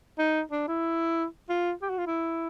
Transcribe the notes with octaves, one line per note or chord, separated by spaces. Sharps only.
D#4
D4
E4
F4
G4
F#4
F4
E4